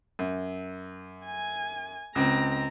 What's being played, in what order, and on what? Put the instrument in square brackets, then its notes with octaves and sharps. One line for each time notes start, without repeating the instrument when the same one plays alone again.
[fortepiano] F#2
[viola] G#5
[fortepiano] C#2 C4 [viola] A#5